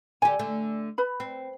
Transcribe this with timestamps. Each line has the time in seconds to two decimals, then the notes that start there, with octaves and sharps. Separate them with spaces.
0.22 D3 G4 G#5
0.39 D3 A3
0.98 B4 B5
1.20 C4